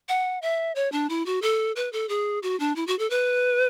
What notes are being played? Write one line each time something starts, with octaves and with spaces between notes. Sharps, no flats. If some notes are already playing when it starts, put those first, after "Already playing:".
F#5
E5
C#5
D4
E4
F#4
A4
B4
A4
G#4
F#4
D4
E4
F#4
A4
B4